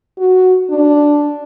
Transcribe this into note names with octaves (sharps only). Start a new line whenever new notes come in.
F#4
D4